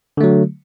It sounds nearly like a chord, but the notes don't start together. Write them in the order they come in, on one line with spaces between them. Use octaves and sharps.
D3 A3 F#3